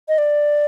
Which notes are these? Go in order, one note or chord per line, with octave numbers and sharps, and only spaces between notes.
D#5
D5